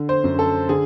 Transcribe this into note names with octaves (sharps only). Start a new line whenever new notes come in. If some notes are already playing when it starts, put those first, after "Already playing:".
Already playing: D3
C5
F#2
A4
D3 G#4